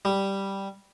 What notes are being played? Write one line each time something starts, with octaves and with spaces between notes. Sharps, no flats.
G3